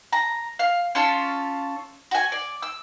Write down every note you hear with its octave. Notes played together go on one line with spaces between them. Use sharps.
A#5
F5
C#4 F4 A4
F#4 G#5
D5
E6